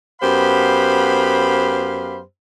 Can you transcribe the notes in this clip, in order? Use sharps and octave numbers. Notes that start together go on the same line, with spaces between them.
F#2 B3 G4 C5 F5 B5